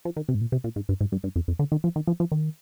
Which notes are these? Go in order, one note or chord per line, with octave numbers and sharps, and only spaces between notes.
F3
D#3
C3
G#2
A#2
C3
A#2
G#2
G2
G#2
G2
G2
F2
F2
D3
D#3
F3
D#3
F3
F3
D#3